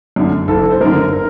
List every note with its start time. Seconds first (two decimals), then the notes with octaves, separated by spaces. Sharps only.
0.16 F#2 D3
0.48 F#1 A4
0.71 C5
0.81 F#2 D3 A#4
1.13 A#4